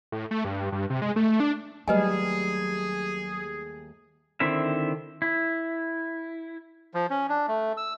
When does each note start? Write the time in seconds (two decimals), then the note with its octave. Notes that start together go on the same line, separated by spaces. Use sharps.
0.12 A2
0.31 A3
0.45 G2
0.72 G2
0.90 C3
1.02 G#3
1.16 A3
1.40 D4
1.88 D#2 F#3 G3 A3 G#4 B4 D#5 G#5
4.40 D3 D#3 C4 E4 E5
5.22 E4
6.94 F3
7.10 C#4
7.29 D4
7.48 A3
7.77 E6